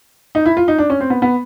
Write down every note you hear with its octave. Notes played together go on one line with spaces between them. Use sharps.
D#4
E4
F4
D#4
D4
C#4
C4
B3
B3